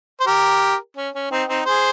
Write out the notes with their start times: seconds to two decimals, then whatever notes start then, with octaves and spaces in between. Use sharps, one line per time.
0.20 C5
0.26 G4 A#4
0.97 C#4
1.14 C#4
1.31 C4 D#4
1.49 C4 D#4
1.66 G#4 C5